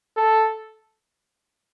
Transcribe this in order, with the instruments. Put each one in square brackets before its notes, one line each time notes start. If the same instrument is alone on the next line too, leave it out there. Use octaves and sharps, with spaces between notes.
[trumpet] A4